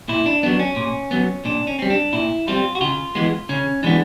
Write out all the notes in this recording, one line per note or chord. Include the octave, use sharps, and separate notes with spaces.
A#2 E4
D4
F#3 B3 D4
C#4
A#2
F#3 B3
A#2 D4
C#4
G3 C4
D4
A#2 E4
G3 C4 F4
F#4
C#3 F4
E3 G#3 B3
C#3 C#4
E3 G#3 B3 D4